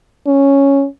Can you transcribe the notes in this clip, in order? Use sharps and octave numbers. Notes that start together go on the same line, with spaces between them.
C#4